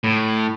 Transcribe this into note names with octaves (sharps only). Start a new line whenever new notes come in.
A2